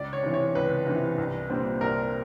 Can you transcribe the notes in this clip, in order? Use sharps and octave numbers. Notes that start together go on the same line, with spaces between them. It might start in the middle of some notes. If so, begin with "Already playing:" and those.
Already playing: C#2 D5
C#5
C3 E3
C#5
C#2 B4
C3 E3
C2
A#2 G3 C4
C2 A#4